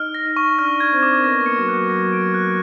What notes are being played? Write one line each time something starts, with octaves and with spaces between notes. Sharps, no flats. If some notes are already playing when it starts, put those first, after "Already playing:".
Already playing: D#4 D#5 F6
A#6
D#4 D#5
C#6
D4 D5 F6
G#6
C4 C5
D6
A#4
B3 B4 A#6
A#3 A#4
C#7
F#3 F#4
F#6
F#3 F#4
A#6
D7
F#6